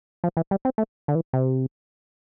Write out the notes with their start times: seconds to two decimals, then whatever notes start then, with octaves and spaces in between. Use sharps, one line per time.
0.24 F3
0.37 E3
0.51 G3
0.65 C4
0.78 A3
1.08 D3
1.15 E3
1.33 C3